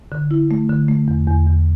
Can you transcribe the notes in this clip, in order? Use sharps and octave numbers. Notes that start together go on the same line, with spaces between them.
D3
E4
A3
D3
A3
E2
E2
E2